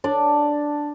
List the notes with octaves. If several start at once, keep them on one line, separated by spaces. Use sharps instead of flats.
D4 D5